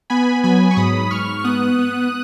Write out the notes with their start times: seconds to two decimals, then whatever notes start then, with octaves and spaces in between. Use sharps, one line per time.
0.10 B3 G#5 B5
0.43 F#3 G#5 B5
0.71 C#6
0.77 G#2 B5 D#6
1.11 G#2 C#6 F6
1.38 F6
1.44 B3 D#6 F#6
1.79 B3